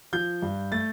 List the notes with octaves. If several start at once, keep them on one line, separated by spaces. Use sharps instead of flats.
F3 G6
G2
A3 A6